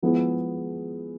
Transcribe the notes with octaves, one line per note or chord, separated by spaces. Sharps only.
F3 G#3 B3 E4 G#4